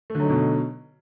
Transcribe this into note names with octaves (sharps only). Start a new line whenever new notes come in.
B2 D3 F#3 A3 D#4